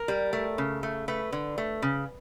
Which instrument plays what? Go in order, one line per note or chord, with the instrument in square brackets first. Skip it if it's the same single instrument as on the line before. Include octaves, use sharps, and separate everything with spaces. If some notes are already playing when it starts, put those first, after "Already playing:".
Already playing: [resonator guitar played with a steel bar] A#4
G3
A3
C#3
A3
A3 B4
D3
A3
C#3